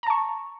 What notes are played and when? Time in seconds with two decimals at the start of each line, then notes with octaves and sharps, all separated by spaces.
0.03 A#5
0.07 A5
0.10 C#6